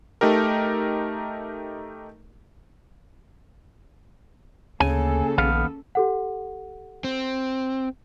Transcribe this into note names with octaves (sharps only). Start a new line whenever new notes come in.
A3 D#4 G4 A#4
D2 C#3 A#3 C#4 A4 G#5
A#1 D#2 B3 F5
G4 A4 F#5
C4